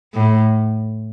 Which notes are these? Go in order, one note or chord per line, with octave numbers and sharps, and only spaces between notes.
A2